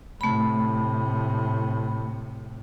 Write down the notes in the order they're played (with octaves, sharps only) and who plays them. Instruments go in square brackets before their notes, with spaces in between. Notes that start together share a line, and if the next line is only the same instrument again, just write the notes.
[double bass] A2 C3 [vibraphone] A3 B5